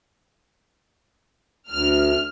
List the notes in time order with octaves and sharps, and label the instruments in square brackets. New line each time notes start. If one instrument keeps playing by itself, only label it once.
[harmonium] D2 [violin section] F6